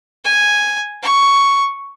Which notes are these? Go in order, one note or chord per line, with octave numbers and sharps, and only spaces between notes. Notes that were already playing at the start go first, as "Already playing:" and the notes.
G#5
C#6